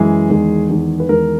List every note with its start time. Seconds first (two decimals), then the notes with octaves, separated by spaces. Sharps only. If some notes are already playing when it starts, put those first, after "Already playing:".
Already playing: F#2 E3 G#3 G#4
0.29 E2 D#3 G#3
0.69 E2 D#3 G#3
1.00 B4
1.09 E2 D#3 G#3 A#4